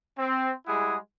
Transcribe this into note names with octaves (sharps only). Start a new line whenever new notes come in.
C4
G3 G#3 E4 G#4 F#5 D#6